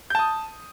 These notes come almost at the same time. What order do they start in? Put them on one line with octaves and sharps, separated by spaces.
G6 A5 D#6